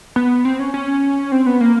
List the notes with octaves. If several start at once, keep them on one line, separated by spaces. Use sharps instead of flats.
B3
C4
C#4
C#4
C4
B3
A#3